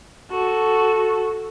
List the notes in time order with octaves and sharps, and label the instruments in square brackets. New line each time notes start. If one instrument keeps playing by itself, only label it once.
[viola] F#4 A4